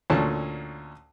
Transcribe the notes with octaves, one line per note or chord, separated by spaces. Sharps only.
D2 A#2 C#4 A5